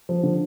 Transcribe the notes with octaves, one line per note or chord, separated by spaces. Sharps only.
F3
D3